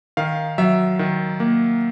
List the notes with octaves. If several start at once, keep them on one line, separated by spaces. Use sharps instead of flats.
D#3 F5
F#3 E5
D#3
A#3